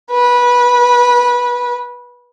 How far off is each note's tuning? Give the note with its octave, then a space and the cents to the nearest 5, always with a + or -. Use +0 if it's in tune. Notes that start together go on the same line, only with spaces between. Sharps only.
B4 -20